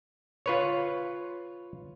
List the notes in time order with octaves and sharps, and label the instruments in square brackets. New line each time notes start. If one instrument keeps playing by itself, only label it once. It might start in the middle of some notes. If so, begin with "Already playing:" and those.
[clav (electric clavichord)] F4 B4 C#5